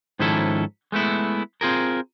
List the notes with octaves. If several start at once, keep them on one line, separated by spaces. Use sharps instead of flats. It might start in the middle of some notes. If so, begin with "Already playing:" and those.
G#2 D#3 F3 C#4 E4 A4
G#3 A3 B3 E4
C4 F4 G#4 A#4